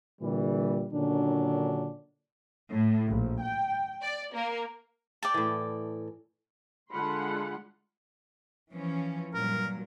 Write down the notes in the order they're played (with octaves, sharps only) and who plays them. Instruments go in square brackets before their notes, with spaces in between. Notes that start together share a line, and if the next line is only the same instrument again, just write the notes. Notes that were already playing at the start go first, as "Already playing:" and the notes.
[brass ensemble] A#2 D3 E3 G3
A#2 D3 D#3 F#3 C#4 D4
[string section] A2
A#1
G5
D5
A#3
[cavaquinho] D5 G5 A5
[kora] A2 E3
[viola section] D3 G#3 F4 F#5 B5 C6
[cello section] E3 F3 C#4
[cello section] G2 A#2 F#3 [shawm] A#4